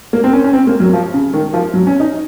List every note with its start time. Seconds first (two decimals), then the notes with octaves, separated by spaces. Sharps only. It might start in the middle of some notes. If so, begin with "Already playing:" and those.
0.13 A#3
0.24 C4
0.33 C#4
0.44 C#4
0.53 C4
0.67 A#3
0.80 F#3
0.93 F3
1.14 C#3
1.34 D#3
1.53 F3
1.74 F#3
1.87 C#4
2.00 D#4